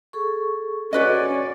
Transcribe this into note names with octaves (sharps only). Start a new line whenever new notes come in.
G#4 A4 C#6
C#4 F#4 B4 D5 D#5